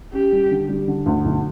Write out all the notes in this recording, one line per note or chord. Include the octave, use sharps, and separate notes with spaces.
C#4 G4
G3
D3
G3
D3
D2
B1